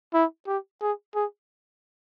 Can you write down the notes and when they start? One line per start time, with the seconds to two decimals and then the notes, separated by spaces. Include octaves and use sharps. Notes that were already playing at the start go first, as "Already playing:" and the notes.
0.14 E4
0.47 G4
0.82 G#4
1.15 G#4